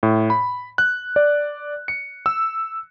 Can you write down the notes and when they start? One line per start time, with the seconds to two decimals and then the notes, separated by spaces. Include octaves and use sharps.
0.03 A2
0.30 B5
0.78 F#6
1.16 D5
1.88 C#7
2.26 E6